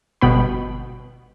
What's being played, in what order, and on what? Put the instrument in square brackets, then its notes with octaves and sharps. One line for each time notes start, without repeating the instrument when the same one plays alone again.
[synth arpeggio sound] G1 B2 B3 G5 B5